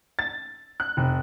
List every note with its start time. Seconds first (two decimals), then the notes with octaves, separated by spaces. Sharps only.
0.19 A6
0.80 F#6
0.97 F1